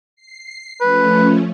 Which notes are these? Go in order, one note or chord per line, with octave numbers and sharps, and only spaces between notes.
C7
F3 A3 C#4 B4